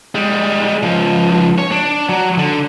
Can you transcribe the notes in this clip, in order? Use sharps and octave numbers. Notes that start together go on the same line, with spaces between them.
G3 G#3
C#2 F3
C#5
D4
F#3
D3